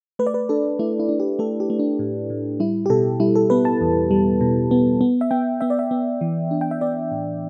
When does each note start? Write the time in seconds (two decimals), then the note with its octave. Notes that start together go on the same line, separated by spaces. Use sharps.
0.19 A3 B4
0.27 D5
0.34 B4
0.49 D4 A4
0.79 A3 E4
1.00 E4
1.09 D4
1.20 G4
1.39 A3 A4
1.60 G4
1.70 A3
1.79 D4
1.99 A2
2.30 A2
2.60 G3 E4
2.86 G4
2.90 B2 A4
3.20 G3 E4
3.35 A4
3.50 B3 B4
3.65 A5
3.81 E2
4.11 G3
4.41 B2
4.71 B3
5.01 B3
5.21 E5
5.31 B3 G5
5.61 B3 E5
5.70 D5
5.79 E5
5.91 B3
6.21 E3
6.51 D4
6.61 G5
6.71 E5
6.81 B3 D5
7.12 A2